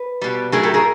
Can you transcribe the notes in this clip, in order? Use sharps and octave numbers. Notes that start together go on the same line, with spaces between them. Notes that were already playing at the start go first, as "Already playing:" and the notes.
Already playing: B4
B2 G3
A2 F#3 A3 G#4 A#4
G4 A4
G#4 A#4